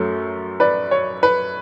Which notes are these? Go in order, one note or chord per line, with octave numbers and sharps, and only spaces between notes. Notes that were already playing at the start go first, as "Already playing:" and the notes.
Already playing: F#2 F#3 A3
B4 D5
C#5
B4